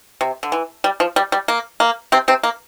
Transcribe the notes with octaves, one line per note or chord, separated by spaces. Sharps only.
C3
D3
E3
G3
F3
G3
G3
A#3
A#3
C3 C4
C3 C4
A#3